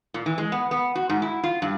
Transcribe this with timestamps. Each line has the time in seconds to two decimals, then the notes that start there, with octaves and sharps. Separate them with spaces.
0.14 A#2
0.26 E3
0.38 G#3
0.52 B3
0.71 B3
0.95 F#4
1.09 G#2
1.22 E4
1.44 F4
1.62 G2